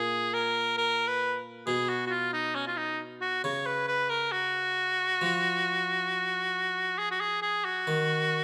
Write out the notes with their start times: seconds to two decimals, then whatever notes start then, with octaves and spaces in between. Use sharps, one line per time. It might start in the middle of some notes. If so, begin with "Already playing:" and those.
Already playing: A#2 G#4
0.34 A#4
0.78 A#4
1.07 B4
1.67 B2 G#4
1.89 F#4
2.07 F#4
2.10 F4
2.33 D#4
2.55 C#4
2.67 F4
2.77 D#4
3.21 F#4
3.44 C#3 C#5
3.66 B4
3.88 B4
4.10 A#4
4.32 F#4
5.22 F3
6.98 G#4
7.11 F#4
7.20 G#4
7.42 G#4
7.65 F#4
7.87 D#3